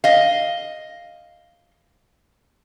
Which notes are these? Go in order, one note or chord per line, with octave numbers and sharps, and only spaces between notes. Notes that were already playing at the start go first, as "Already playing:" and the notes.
D#5 F5